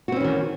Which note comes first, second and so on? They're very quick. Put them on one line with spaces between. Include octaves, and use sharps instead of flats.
F#4 C4 C#4 E3 D#3